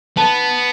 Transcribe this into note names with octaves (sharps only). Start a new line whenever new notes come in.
B3 A5